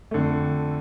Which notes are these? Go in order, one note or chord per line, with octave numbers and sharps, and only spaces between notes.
F2 D3 A3